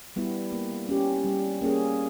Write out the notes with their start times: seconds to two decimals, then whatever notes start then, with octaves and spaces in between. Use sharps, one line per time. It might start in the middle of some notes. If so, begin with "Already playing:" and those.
0.16 G3 B3 E4 G4
0.52 A#3
0.89 C#4 G4
1.25 G3
1.62 A#3 C#4 G#4